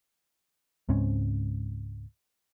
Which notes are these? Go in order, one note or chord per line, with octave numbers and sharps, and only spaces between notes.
C#2 G#2 C4 C#4